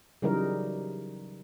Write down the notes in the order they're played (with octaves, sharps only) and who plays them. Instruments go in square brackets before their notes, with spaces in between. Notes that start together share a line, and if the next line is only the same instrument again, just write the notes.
[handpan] C#3 E3 F#3 G3 D#4 A#4